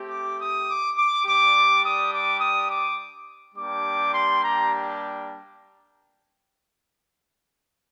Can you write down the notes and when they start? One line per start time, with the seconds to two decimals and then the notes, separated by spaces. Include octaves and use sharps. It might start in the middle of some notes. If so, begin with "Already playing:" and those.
Already playing: A3 C4 G4
0.10 D6
0.39 D#6
0.68 D6
0.96 D6
1.25 G3 D4 G4 D6
1.83 D#6
2.11 D6
2.39 D#6
2.68 D6
3.54 G3 A#3 D4 G4 D6
4.11 C6
4.40 A#5